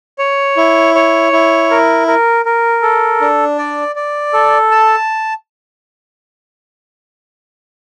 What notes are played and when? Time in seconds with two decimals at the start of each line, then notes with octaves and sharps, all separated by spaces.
0.19 C#5
0.57 E4
0.95 C#5
1.32 E4
1.70 A#4
2.07 A#4
2.45 A#4
2.82 A4
3.21 D4
3.58 D5
3.96 D5
4.33 A4
4.71 A5